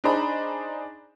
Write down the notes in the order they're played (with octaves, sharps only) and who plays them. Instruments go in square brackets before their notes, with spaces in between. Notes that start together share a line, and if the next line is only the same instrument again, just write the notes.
[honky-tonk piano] D4 D#4 G#4 C5 A#5 B5